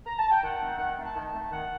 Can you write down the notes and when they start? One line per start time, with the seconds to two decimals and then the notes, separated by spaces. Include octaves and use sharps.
0.06 A#5
0.19 A5
0.31 G5
0.43 D#3 F#5
0.61 A3 C4 D#4
0.79 D#3 F#5
0.97 A3 C4 D#4
1.03 A5
1.15 D#3 A5
1.33 A3 C4 D#4
1.51 D#3 F#5